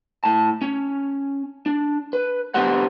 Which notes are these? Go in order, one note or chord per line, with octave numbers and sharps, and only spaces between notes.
A2 A5
C#4
D4
B4
B3 D4 G4 B4 C5 F#5